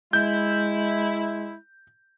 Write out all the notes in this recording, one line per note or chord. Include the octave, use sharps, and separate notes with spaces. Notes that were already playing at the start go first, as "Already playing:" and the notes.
G#3 E4 G6